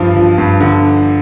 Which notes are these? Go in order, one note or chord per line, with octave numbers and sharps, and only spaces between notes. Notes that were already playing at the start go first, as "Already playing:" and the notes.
Already playing: G2 F3 F4
F3
G2
D3